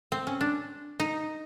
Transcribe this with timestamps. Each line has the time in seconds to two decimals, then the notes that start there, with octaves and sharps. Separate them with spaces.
0.12 C4
0.27 C#4
0.41 D4
1.00 D#4